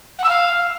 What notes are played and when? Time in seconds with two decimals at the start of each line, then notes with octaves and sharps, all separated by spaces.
0.19 F#5
0.24 E6
0.29 F5